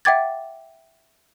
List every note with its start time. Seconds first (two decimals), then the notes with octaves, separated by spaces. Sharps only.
0.05 E5 F#5 G5 D6 G#6 A6